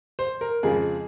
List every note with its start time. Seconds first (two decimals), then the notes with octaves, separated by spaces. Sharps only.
0.19 C5
0.41 A#4
0.63 F2 C#3 F3 G#3 G#4